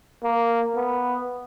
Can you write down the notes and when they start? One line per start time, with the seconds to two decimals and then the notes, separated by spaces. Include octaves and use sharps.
0.24 A#3
0.76 B3